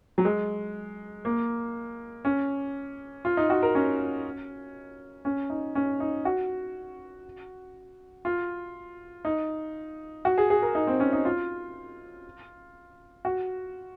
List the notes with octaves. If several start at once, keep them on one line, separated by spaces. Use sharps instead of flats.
F#3
G#3
A#3
C#4
F4
D#4
F#4
A#4
C#4
C#4
D#4
C#4
D#4
F#4
F4
D#4
F#4
G#4
G#4
A#4
D#4
C4
C#4
D#4
F4
F#4